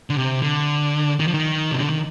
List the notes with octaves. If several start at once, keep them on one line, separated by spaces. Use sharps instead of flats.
D3
C3
D3
D#3
F3
D#3
C3
D3
D#3